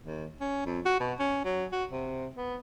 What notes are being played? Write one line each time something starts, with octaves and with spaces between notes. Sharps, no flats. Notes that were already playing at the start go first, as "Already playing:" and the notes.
D#2
C#4
F2
F#4
B2
C#4
F#3
F#4
C3
B3